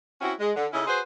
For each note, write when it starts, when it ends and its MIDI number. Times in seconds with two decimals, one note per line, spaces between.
0.22 0.33 60
0.22 0.33 61
0.22 0.33 64
0.22 0.33 66
0.40 0.52 56
0.56 0.67 50
0.73 0.86 49
0.73 0.86 61
0.73 0.86 63
0.73 0.86 64
0.73 0.86 69
0.73 0.86 75
0.87 1.00 66
0.87 1.00 68
0.87 1.00 71
0.87 1.00 72